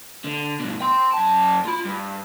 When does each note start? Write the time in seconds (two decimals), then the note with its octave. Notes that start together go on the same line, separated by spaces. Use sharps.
0.24 D3
0.60 G2 B2
0.81 G5 C6
1.12 F#2 A5
1.65 F4 B5
1.85 G2